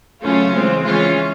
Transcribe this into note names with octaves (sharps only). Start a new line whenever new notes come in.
C#3 F#3 A3 C#4 F4
E3 G#3 C4
E3 G#3 C#4 F4